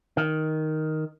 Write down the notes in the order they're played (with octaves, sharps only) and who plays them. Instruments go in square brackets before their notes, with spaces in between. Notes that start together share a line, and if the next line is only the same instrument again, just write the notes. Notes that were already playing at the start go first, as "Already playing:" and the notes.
[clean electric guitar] D#3